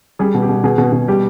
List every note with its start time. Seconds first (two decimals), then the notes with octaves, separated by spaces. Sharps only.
0.19 G3 G#4
0.34 B2
0.42 G4
0.49 B2
0.64 B2 G#4
0.78 B2
0.92 B2
1.08 G3 G4